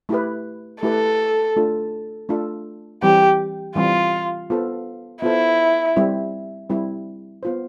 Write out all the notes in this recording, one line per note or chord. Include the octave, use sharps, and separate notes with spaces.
A3 E4 G4 B4
A3 E4 G4 A4 B4
A3 D4 F4 A4
A3 D4 F4 A4
E3 G3 C4 G4
E3 G3 C4 F4
B3 F4 A4 C5
B3 E4 F4 A4 C5
G3 C4 E4
G3 C4 E4
B3 F4 C5